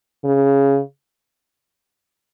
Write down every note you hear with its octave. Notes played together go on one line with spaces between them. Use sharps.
C#3